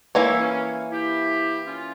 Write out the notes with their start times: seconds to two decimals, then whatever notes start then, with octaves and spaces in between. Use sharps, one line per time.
0.15 E3 A#3 E4 C#5
0.40 C#4
0.91 E4 G4
1.67 C#4 F4